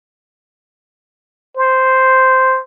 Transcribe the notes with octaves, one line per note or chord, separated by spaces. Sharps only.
C5